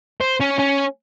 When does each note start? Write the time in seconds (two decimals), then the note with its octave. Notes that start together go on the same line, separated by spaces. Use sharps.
0.21 C5
0.41 C#4
0.59 C#4